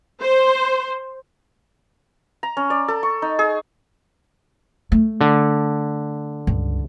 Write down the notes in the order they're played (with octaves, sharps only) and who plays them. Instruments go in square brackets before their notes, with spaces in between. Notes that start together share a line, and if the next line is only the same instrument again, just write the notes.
[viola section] C5
[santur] A#5
C#4
D5
A4
C#6
D#4
G#4
[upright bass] A3
[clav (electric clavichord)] D3
[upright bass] C#2 G2